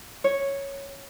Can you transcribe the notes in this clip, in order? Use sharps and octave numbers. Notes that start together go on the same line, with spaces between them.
C#5